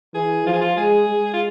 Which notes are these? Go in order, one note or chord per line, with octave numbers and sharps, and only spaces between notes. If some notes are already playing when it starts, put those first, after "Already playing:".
E3 G#4
F3 F4
G#4
F4
G#3 G#4
G#3
F4